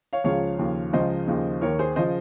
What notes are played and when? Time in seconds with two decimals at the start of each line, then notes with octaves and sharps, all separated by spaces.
0.13 C#5 F5
0.24 C#2 C#3 F3 C#5 F5
0.58 D#2 C#3 F3
0.93 C#2 C#3 F3 C5 D#5
1.28 D#2 C#3 F3
1.61 D#2 D#3 A#4 C#5
1.79 G#4 C5
1.96 C#3 F3 C5 D#5